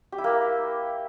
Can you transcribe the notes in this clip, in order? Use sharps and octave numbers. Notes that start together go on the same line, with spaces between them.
G4
E4
A#3